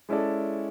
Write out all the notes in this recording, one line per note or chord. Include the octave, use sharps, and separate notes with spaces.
G#3 C#4 E4 A4 D5